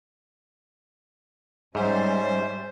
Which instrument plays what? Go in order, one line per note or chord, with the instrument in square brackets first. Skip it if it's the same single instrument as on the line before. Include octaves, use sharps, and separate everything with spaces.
[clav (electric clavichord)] G#2 [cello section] G3 [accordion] C#4 E5 [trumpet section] C5